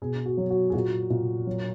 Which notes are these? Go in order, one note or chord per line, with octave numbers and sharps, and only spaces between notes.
B2 G#4
F#4
F#3
F#4
G#4
A#2 F#4
A#2
F#3